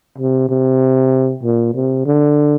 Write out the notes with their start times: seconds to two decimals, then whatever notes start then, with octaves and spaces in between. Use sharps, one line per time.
0.18 C3
0.49 C3
1.43 A#2
1.74 C3
2.06 D3